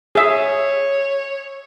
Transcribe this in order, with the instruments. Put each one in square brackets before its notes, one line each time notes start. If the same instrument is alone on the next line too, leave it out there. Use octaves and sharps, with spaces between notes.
[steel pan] G#4 E5 [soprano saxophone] C#5